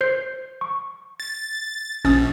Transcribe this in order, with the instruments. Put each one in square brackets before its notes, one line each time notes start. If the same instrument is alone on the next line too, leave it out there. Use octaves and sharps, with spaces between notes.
[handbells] C5 G6 C7
C#6
[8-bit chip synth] A6
[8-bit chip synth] A#1 [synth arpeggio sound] C#4 D#6 [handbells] A6